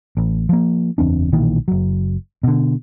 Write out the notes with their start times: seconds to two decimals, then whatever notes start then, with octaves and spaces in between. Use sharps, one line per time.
0.17 A1
0.49 F3 A#3
0.98 F#1 E2 C4 D4
1.32 B1 A#2 D#3 E3
1.68 F#1 F#3
2.43 B2 D3